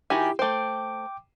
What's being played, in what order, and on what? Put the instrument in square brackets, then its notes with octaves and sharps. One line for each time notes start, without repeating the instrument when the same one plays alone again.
[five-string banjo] D#3 F#4 G#5 [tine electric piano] E4 G4
[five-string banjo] A3 C5 [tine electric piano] G5 D6